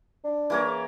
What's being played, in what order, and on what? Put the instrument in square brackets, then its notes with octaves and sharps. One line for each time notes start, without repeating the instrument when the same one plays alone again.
[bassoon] D4
[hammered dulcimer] E3 A#3 C#5